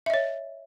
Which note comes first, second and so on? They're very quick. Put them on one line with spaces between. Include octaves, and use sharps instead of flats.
E5 D#5 C#5